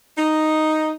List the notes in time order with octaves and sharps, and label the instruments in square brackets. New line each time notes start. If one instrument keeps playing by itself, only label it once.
[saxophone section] D#4